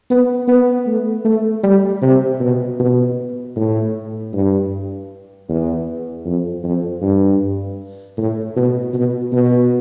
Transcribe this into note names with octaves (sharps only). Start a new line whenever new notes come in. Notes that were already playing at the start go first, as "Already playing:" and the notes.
B3
B3
A3
A3
G3
C3
B2
B2
A2
G2
E2
F2
F2
G2
A2
B2
B2
B2